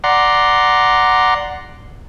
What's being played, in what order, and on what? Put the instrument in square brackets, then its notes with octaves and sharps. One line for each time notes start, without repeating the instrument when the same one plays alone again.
[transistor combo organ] D5 F#5 A#5 C6